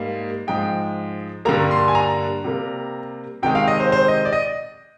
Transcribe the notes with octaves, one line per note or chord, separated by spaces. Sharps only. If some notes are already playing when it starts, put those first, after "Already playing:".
Already playing: G#2 G3 A#3
G#2 F3 G#3 G5
G2 D3 G3 A#3 A#5
C6
G#5
A#5
C3 G3 A#3
C3 D#3 G#3 G5
F5
D#5
C5
C5
D#5
D5
D#5